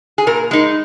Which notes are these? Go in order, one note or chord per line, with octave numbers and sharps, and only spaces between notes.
G#4
A#2 A#4
G#3 D#4